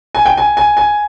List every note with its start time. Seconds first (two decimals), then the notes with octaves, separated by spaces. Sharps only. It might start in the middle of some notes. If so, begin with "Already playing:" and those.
0.15 G#5
0.26 G5
0.37 G#5
0.57 G#5
0.77 G#5